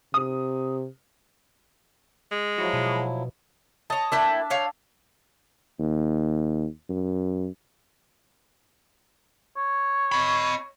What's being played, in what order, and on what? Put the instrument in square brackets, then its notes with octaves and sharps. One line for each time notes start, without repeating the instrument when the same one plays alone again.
[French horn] C3 [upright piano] D#6
[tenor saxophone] G#3
[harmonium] F3 F#3 E4 [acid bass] F#4
[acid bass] B2
[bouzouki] C#5 D#5 [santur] A5
[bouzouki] A#3 E4 G5 [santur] D4 E5
[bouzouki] C#5 F5 G5
[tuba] D#2
F#2
[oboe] C#5
[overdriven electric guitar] D#5 B5